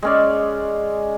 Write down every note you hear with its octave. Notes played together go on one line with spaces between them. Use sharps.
G#3 C#4 D5